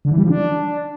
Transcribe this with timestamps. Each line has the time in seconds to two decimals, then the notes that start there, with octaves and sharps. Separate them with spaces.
0.05 D3
0.11 E3
0.18 G3
0.24 F3
0.30 D4